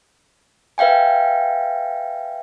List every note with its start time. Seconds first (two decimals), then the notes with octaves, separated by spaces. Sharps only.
0.78 B4 E5 F5 G5 G#5